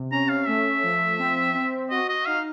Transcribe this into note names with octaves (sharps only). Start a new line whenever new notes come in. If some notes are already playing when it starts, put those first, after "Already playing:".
Already playing: C3
C#4 A#5
F5
A3 E5
F3
C4
C4
F#4 D#5
D#5
D#4 F5